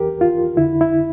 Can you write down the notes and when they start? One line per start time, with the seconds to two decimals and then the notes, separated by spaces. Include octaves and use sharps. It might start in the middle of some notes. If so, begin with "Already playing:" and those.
Already playing: E2 E3 G4 A#4
0.21 F4
0.56 F2 D3 E4
0.81 E4